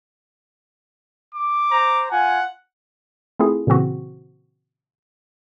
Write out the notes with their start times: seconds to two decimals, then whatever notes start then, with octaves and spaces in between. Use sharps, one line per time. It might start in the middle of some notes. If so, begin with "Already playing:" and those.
1.35 D6
1.71 C5 A#5
2.12 F4 F#5 G#5
3.39 A3 C4 E4 F4 G#4
3.67 A#2 C#3 E3 C4 F#4